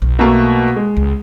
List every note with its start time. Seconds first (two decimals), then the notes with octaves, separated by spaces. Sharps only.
0.02 B1
0.19 B2 A3 A#3
0.76 G#3
0.97 C#2